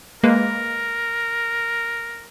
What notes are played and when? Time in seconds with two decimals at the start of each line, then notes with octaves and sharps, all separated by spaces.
0.23 G#3 A#3 A#4 B4